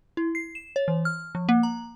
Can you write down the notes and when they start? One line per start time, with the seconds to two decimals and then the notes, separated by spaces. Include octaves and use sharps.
0.17 E4
0.35 C7
0.55 E7
0.76 C#5
0.88 E3
1.05 F6
1.35 F3
1.49 A#3
1.63 A#5